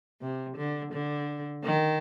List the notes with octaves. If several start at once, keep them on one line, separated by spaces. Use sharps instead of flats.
C3
D3
D3
D#3